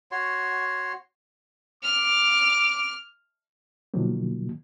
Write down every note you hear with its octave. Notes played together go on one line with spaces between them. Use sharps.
F#4 C#5 C6
D6 F6
B2 D3 D#3 F3 F#3 A#3